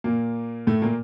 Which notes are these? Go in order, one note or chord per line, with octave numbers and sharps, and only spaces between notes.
A#2 A#3
A2 A3
A#2 A#3